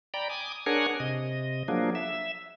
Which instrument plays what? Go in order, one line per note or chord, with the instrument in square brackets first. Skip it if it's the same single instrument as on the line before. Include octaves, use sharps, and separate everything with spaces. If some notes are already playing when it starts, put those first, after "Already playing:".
[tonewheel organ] D5 G5 A#5 B5
G#5 D6 D#6
D4 G#4 A#4 C#5 F#5 G#5
C3 D#5
F3 F#3 A#3 D4 G#4
E5